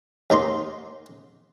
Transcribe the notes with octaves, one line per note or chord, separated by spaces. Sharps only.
D#2 D#4 A#5 C6